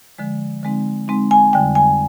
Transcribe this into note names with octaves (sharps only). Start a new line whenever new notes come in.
D3 F3 G#3
D3 G#3 C4 D#4
D3 G#3 C4 D#4
G#5
F2 D3 G3 G5
G#5